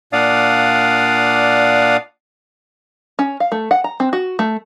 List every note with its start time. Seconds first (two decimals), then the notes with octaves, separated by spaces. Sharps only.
0.13 A#2 D4 D5 F5 F#5 D#6
3.19 C#4
3.40 F5
3.52 A3
3.71 F#5
3.84 A#5
4.00 C4
4.13 F#4
4.39 A3